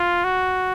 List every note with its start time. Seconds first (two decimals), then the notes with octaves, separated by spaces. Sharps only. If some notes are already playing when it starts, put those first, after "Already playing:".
Already playing: F4
0.24 F#4